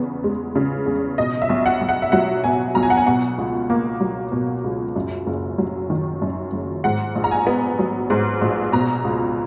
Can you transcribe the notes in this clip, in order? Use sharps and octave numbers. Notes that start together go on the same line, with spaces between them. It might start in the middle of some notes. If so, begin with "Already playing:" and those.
Already playing: E2 C#3 B3
G#3
C#3
E2
B2 D#5
E5
B1
F#5
B1
F#5
E5
F#3 F#5
B2 G#5
B1 A#5
G#5
F#5
G#5
B2 F#5
C#2
A#3
F#3
B2
C#2
F#2
F#1
F#3
D#3
F#2
F#1
G#2 F#5
A#1
A#5
G#5
B3
F#3
G#2
A#1
B2 A#5
C#2